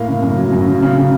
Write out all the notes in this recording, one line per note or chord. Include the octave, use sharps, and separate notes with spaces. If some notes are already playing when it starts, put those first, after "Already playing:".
Already playing: A2 A#3 F5
C#3
F#2
F#3
F#2
C#3
C#3
C#3